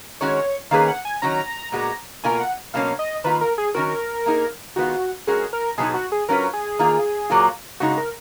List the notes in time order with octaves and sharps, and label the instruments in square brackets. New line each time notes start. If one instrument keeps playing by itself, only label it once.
[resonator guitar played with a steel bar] D#3 G#3 C#4 F#4 [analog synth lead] C#5
[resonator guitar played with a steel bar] D#3 A#3 C#4 G#4 B4 [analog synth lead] F5
[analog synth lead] F#5
G#5
[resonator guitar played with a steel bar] D#3 F#3 C#4 [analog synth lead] A#5
[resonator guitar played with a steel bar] A#2 G#3 B3 F#4
[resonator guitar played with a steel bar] B2 A#3 F4 A#4 [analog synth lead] G#5
[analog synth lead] F#5
[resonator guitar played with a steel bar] B2 F#3 A#3 C#4 [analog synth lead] F5
[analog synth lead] D#5
[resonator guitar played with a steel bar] D#3 A#3 F4 [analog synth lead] B4
[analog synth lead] A#4
G#4
[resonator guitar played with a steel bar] D#3 F#3 C#4 F#4 [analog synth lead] A#4
[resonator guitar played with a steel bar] A#3 D#4 G#4
[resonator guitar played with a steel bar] D#3 G#3 B3 F4 [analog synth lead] F#4
[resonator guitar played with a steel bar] G#3 C#4 F#4 A#4 [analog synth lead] G#4
[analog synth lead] A#4
[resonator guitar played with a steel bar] B2 F#3 B3 D#4 [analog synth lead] G#4
[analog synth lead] F#4
G#4
[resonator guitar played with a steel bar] F#3 C#4 F4 B4 [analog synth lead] A#4
[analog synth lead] G#4
[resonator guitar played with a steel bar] D#3 A#3 F4
A#2 F#3 A#3 F4
[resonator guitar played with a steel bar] C#3 G#3 D#4 [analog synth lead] F#4
[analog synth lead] A#4